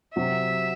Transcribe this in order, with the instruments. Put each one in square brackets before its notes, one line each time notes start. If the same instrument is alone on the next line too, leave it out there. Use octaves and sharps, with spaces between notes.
[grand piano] C3 F#3 C4 F#4 [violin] E5